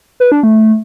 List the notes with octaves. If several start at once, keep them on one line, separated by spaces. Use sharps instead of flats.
B4
D4
A3